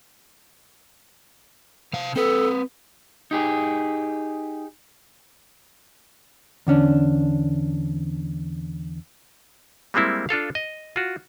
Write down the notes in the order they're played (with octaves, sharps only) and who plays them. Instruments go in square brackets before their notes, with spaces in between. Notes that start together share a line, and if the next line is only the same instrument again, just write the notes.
[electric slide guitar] C3 F5 A5
[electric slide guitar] C4 B4 [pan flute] A4
[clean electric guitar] D#4 G4 G#4
[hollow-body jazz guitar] E2 D3 C#4 D4
[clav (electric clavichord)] G3 G#3 A#3 C4 E4
D4 F4 A4 F5
D#5
F4 F#4